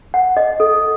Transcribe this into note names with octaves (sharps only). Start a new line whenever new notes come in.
F#5
D#5
A4